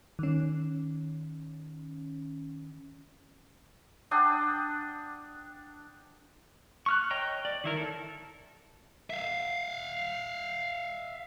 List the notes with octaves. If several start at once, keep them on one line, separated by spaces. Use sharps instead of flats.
D#3 C#4
D4 F#5 G5 D#6
C#6 F6 F#6
C#5 D#5 G5 A#5
D5
D#3 E4 A#4
A4
E5 F5